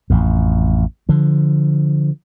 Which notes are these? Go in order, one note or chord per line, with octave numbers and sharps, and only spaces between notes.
A1 F2
D3 F3